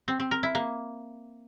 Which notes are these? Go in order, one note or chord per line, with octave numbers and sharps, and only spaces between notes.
C4
C4
A#4
E4
A#3